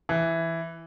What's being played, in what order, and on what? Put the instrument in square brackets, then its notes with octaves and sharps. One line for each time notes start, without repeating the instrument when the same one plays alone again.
[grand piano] E3